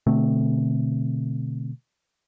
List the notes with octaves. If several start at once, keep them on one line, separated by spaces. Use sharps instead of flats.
B2 D3 A3 C4